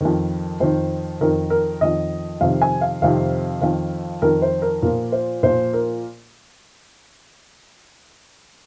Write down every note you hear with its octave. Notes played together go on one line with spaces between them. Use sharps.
F2 D#3 A#4
F2 D#3 C5
F2 D#3 A#4
A#4
F2 D#3 D#5
F2 C3 D#3 F5
G#5
F5
F2 C3 D#3 F5
F2 D#3 F5
F2 D#3 A#4
C5
A#4
A#2 F3 A#4
C5
A#2 F3 C5
A#4